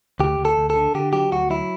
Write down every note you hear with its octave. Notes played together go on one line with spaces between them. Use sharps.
D2 G4
D2
A4
D2
A4
D3
D3 G4
F#3 G4
D2 F#4
F#3 E4